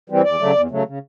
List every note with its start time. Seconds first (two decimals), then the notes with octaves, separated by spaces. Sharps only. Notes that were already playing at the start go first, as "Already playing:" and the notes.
0.10 E3 G3 C4
0.24 E2 D5
0.40 C#3 F#3 A3
0.55 E2
0.70 C#3 F#3 A3
0.86 C#3